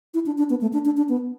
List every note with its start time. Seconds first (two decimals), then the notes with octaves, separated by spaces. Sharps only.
0.14 E4
0.26 D4
0.38 D4
0.50 B3
0.61 A3
0.73 D4
0.85 D4
0.97 D4
1.09 B3